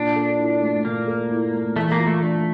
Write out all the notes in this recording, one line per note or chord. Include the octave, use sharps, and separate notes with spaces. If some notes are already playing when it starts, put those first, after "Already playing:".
Already playing: A#2 D4
A4
E4
A3
A#2 A#3
A4
E4
A3
E3 A3
A#3
F4
A3
A3 D4